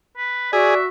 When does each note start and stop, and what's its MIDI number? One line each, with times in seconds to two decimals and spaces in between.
0.17 0.49 71
0.53 0.87 66
0.53 0.74 68
0.53 0.78 74
0.53 0.85 76